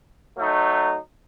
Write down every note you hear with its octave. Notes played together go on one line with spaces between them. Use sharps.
F#3 A3 D#4